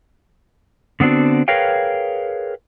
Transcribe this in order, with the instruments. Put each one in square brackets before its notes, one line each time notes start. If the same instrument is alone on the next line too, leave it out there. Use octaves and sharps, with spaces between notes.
[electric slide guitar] D3 B3 C4 D4 F#4
G#4 A#4 B4 C#5 F5 G5